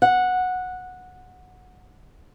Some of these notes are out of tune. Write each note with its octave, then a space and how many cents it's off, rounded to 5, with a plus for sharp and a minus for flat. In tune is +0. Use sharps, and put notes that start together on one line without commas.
F#5 -10